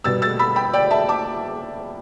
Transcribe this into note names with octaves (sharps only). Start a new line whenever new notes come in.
B2 G3 B3 E6 A6
E6 A6
B5 E6
G5 B5
D5 G5
E5 A5
A5 D6